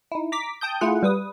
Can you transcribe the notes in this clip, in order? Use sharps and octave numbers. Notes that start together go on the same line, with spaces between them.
D#4 E4
A#5 D6 B6
G5 A5 D#6 G6
A3 E4 F4 G#4 F#5
G3 B4 D#6